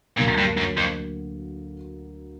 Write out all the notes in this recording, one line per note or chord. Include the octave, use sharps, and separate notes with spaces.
D2 A#2 D3 F#3 A#3
G2
F#2
F2